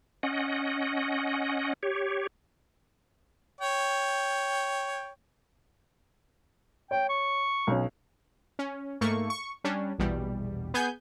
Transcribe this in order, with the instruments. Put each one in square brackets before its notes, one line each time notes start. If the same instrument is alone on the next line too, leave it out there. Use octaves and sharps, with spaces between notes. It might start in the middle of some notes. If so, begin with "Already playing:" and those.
[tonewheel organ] C#4 D#5 F#5
G4 C#5
[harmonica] C#5 G5
[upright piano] C#5 [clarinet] G5
[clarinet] C#6
[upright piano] B1 C#4
[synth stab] C#4
G#2 A3 A#3 C#6
C#6
G3 C#4 D4
A#1 E2 B2 G3
B3 G#4 G#5 G6